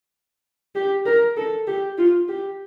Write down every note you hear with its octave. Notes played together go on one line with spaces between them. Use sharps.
G4
A#4
A4
G4
F4
G4